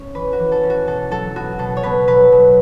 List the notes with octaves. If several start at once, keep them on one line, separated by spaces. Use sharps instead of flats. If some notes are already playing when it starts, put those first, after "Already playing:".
Already playing: C#4 C#5
E3 B4
F#4
E3
A4
C#4
F#4
B2 A4
F#3 A4
B3 F#4
B2 A4
C#5
B2 B4
F#3 B4
B2